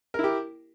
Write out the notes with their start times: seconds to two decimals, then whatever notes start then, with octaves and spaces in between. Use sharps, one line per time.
0.14 A#4
0.19 E4
0.24 G4